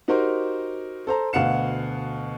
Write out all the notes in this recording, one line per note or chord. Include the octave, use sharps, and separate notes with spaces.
D#4 F#4 G4 A#4 C5
A4 C5 A#5
D2 B2 F5 F#5 C#7 E7